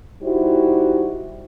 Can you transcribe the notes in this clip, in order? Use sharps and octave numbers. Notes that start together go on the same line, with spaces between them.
G3 D#4 E4 F#4 G4 C5